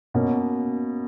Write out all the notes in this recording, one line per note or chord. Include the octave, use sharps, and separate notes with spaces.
B2 A#3 C#4